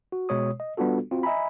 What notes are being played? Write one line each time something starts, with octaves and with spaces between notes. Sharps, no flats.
F#4
B2 G#3 C#5 D#6
D#5
G3 B3 D4 F4 F#4 A4
C4 F4 F#4
D#5 E5 G#5 A#5 B5